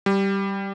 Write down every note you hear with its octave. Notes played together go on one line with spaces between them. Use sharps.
G3